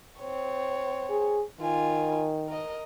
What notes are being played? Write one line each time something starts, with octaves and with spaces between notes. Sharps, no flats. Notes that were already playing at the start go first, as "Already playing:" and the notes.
C4 C#5
G#4
D#3 F4 G#5
A#4 D#5